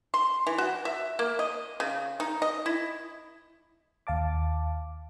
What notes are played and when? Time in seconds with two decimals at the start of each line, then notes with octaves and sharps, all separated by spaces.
0.14 C6
0.47 E3
0.58 F#4
0.85 E5
1.19 A#3
1.39 D#5
1.80 C#3
2.20 D#4
2.42 D#5
2.66 E4
4.07 D#2 F5 A5 D6